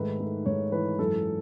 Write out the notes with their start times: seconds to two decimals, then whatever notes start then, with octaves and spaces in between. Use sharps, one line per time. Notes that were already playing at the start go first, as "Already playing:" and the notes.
Already playing: G#2 D#3 A3 B4
0.20 A3
0.46 G#2 C#5
0.72 E3 B4
0.99 F#2 A4